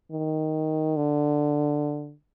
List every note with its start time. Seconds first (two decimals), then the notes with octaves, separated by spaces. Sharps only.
0.11 D#3
0.96 D3